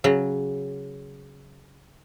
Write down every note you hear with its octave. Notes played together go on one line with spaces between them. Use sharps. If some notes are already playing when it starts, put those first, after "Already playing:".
C#3 F#3